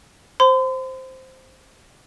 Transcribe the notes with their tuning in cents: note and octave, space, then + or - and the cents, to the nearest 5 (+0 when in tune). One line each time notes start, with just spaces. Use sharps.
C5 +0 C6 -45